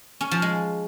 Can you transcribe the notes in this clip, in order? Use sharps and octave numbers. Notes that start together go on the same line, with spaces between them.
C#4
F3
G#3